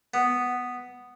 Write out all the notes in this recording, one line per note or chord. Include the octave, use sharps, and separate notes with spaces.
B3